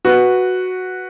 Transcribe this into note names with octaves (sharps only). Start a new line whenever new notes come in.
F#4 B4